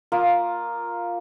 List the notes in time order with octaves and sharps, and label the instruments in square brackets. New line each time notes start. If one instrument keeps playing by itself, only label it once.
[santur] A#3 F4 D#6